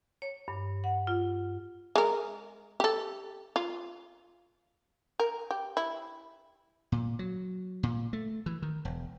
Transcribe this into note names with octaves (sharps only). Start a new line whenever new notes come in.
C#5
G2
F#5
F4
G#3 A#4
G4 A4
F4
A#4
G4
E4
A#2
F#3
A#2
A3
E3
D#3
E1